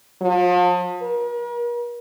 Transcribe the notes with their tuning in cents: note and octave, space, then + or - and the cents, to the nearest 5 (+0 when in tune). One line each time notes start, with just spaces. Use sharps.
F3 +40
A#4 +45